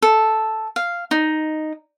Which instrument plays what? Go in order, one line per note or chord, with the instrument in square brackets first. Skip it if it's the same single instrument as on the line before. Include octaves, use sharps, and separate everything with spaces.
[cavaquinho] A4
F5
D#4